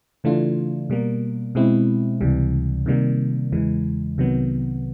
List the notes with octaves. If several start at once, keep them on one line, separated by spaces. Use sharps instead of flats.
C#3 E3 A3 D4 F4
B2 G3 A#3
B2 G#3 C4 E4
C#2 C3 E3 G3
C3 D#3 G3 A#3
E2 C#3 E3 G#3
C2 C3 D#3 F#3 B3